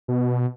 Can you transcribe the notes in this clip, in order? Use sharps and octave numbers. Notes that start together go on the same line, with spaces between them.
B2